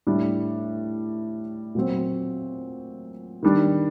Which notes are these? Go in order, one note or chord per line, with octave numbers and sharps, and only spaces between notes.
A2 G3 D4
A#2 F#3 C4
D#3 G3 D4